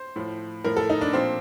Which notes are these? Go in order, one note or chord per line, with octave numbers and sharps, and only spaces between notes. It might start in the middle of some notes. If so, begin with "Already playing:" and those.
Already playing: C5
A2 F3
A2 F3 A#4
A4
D#4
D4
A#2 F3 C4